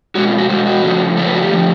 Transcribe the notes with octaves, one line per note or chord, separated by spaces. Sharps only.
B2 G#3 F#4
F4
F#4
B2 G#3 F#4
F#4
C#3 F3 A3
C#3 F3 A3 A4
B4
F#4
G4
D3 F3 A3